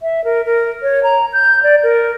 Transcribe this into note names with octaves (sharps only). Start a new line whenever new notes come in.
E5
A#4
A#4
C#5
A#5
G6
D5
A#4